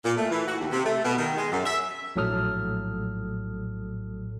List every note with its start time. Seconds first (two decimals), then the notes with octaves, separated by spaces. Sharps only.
0.05 A#2
0.17 A3
0.31 E3
0.48 F#4
0.60 D#2
0.72 C3
0.85 A3
1.04 B2
1.18 D#3
1.37 G#3
1.52 F#2
1.65 E5
2.16 A#1 A2 F#3 A4 D#6 F6